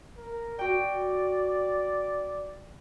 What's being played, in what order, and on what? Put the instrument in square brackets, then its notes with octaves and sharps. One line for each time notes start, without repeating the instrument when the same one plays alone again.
[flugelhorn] A#4
[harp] F#4 G5 [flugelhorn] D5